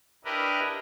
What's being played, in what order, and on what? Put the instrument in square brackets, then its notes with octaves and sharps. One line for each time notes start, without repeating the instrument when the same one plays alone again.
[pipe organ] D4 E4 G4 A#4 B4 D#5